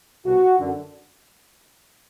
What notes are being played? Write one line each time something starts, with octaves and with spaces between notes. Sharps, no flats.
C2 B2 F#4
F#2 D3